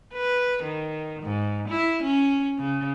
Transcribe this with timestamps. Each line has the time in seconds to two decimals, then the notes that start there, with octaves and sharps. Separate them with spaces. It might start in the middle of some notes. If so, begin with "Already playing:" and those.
0.14 B4
0.63 D#3
1.23 G#2
1.68 E4
2.03 C#4
2.58 C#3